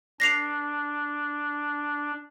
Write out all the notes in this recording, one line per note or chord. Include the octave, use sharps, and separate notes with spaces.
D4 A#6 C7 F7